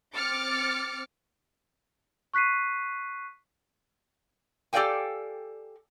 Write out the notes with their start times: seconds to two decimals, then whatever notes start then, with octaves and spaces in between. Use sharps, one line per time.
0.15 C4 D6 F6 A6 C#7
2.34 C#6 F#6 B6 C7 D#7
4.73 G4 A4 D5 F5 G5 G#5